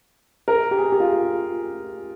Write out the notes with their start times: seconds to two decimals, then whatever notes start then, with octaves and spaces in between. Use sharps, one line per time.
0.48 A#4
0.71 G4
0.77 G#4
0.92 G4
1.00 F4